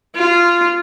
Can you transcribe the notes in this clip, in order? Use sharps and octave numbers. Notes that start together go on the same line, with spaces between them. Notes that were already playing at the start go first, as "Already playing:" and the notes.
F4